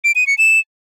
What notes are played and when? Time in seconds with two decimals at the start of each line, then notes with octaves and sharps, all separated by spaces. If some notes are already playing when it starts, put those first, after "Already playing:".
0.04 D7
0.16 D#7
0.27 C#7
0.38 E7